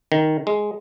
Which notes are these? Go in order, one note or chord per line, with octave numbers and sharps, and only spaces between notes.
D#3
G#3